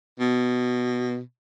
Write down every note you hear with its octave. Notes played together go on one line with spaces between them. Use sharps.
B2